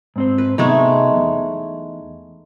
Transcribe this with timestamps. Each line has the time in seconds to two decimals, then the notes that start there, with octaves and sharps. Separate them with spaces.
0.16 G#2 C4 C5
0.38 B4
0.58 C3 F#3 G#3 A3 B3 D#4
1.16 E2